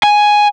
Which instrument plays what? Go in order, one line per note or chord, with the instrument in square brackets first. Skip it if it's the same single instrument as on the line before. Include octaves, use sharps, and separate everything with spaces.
[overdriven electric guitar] G#5